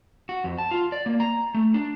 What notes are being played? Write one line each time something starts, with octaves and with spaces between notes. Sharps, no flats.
F#4
F2
A5
F4
D5
A#3
A#5
A3
D4